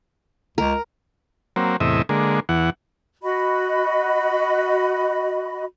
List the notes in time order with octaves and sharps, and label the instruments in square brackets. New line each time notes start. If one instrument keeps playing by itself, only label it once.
[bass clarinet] C#2 [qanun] A#4
[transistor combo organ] F#3 A#3 C4
E2 A2 C3 D#5 E5
D3 G#3 A#3
E2 E3 F#5
[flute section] F#4 D#5 B5